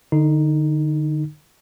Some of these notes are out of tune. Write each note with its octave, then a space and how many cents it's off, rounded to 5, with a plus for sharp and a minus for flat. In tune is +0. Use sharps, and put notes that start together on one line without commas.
D3 +30 D#4 +0